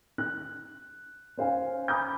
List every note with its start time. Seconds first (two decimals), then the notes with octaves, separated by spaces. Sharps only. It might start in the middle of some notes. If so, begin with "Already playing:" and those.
0.18 F#6
1.37 C#4 C5 F5 G#5
1.88 G#5 A#5 B5 D6 D#6 G6